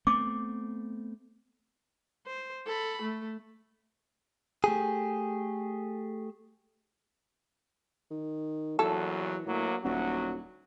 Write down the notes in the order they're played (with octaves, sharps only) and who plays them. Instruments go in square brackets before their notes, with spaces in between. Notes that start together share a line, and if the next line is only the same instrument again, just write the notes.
[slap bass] A3 B3 C4 [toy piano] D6
[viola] C5
A4 B5
A3
[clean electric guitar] A3 G4 G#4
[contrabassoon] D#3
[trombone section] A#1 E2 F#3 [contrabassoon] E3 [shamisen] E4 A4
[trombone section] D2 F#3 A#3 [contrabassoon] A2
[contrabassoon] D#1 [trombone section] D2 F#3 F#4